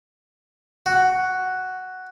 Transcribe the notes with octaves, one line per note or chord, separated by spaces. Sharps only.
F#4